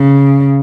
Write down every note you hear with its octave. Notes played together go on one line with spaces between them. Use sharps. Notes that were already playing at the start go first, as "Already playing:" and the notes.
Already playing: C#3